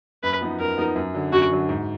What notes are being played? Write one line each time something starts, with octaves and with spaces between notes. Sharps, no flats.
F#2 B4
F3 B3 D#4
F#2 A#4
F3 B3 D#4
F#2
D3 F#3
F#2 F#4
D3 F#3
G#2